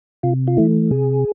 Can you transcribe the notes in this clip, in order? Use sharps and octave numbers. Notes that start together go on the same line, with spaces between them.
C3 F4
F4
E3 A3 E4
C3 G#4